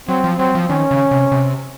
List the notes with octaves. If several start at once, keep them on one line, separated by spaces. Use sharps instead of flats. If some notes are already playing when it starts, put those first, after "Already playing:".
F#3 C4
F3
F#3 C4
F3
D#3 C#4
C#3
C3
C3